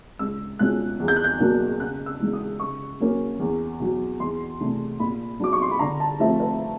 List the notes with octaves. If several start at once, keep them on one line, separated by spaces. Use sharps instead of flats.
C#2 E6
B2 G#3 C#4 F4 F#6
E2
G6
F#6
G6
B2 F#3 A#3 D4
C#3 F#6
E6
E3 G#3
D#6
C#3 C#6
F#3 A#3 C#4
E2
B2 F#3
E2 C6
C3 E3 A3 D4
A#2 B5
F#3 B3 D4 D6
C#6
C6
B5
D3 A#5
A5
F3 A3 C4 E5
B4